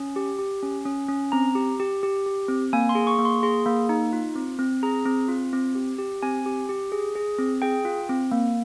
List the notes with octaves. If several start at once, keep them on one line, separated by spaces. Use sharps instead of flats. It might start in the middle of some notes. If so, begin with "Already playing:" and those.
Already playing: C#4
G4
G4
C#4
C#4
C#4
C4 A#5
G4
G4
G4
G4
C4
A#3 G#5
C6
G#4
C#6
A#3
C6
G#4 C6
A#3
D#4
F4
C4
C4
G#4 A#5
C4
F4
C4
G4
G4
C4 G#5
G4
G4
G#4
G#4
C4
G#4 G5
F4
C4
A#3